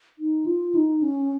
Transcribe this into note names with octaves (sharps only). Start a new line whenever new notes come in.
D#4
F4
D#4
C#4